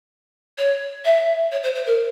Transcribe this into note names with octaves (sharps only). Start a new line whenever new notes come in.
C#5
E5
C#5
C5
C5
A#4